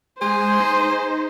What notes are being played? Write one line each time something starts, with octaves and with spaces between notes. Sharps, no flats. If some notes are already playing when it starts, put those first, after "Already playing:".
G#3 G#4 C5 C6
D#4